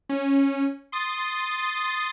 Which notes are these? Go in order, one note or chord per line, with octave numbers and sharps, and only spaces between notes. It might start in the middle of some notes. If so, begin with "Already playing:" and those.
C#4
C6 D#6 A6